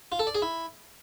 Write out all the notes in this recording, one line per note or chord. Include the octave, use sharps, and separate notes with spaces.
F4
A4
D5
G#4
E4